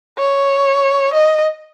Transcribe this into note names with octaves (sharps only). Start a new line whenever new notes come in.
C#5
D#5